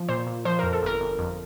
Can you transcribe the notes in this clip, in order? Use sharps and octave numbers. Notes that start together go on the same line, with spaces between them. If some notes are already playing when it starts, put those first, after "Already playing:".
Already playing: F3
A#2 C5
A#2
F3 C5
F2 A#4
A4
G1 A#4
G1
F2